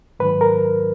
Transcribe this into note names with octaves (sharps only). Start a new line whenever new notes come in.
G#2 D#3 F#3 B4
A#4